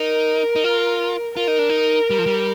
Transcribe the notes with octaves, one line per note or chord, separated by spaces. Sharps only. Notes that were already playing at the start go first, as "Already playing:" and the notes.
Already playing: D#4 A#4
D#4
F4
F4 A#4
D#4
D4
D#4
G3
F3
G3